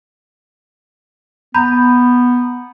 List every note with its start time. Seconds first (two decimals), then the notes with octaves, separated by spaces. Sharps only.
1.54 B3 A#5 B5 G6